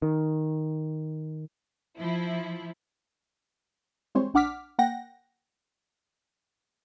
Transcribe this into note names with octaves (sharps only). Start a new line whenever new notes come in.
D#3
F3 E4
E3 G3 G#3 C4 C5 C#5
A#1 D4 F#5 D6 F6 B6
A#3 F#5 G5 A#6